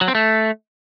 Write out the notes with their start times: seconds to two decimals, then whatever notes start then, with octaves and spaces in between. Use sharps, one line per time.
0.01 F#3
0.08 C4
0.15 A3